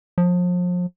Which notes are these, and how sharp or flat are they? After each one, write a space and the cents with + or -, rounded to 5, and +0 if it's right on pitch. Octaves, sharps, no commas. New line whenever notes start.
F3 +35